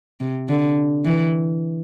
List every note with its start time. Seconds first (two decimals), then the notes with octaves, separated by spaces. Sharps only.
0.20 C3
0.48 D3
1.05 E3